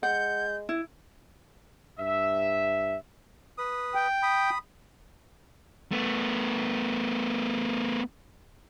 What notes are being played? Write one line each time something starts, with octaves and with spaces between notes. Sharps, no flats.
G#3 F#5 G6
E4
G2 E5
B4 D#6
G5
B5 D#6
A3 B3